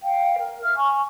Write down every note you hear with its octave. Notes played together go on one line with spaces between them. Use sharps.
F5 G5
A#4
E5 F5 F6
G#5 C#6